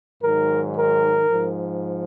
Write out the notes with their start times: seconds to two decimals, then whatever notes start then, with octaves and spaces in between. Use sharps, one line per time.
0.22 G#2 D#3 F#3 A#4
0.76 A#4
1.30 G#2 F3